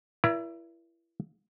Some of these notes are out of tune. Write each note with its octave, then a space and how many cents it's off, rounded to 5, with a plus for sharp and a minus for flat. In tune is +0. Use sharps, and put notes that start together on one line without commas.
E4 +25 A#4 +45 D5 -15